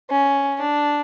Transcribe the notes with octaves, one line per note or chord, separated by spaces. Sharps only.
C#4
D4